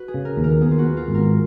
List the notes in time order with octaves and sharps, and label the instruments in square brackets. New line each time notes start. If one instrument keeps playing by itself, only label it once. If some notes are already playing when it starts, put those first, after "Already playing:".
Already playing: [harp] F#4 B4
G#4
[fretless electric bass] C#3
[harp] A#4
[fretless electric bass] D#2
[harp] A#4
[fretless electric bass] B3 [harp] G#4
[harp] F4
F#4
[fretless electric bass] B3
[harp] F4
[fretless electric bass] G#1
[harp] A#4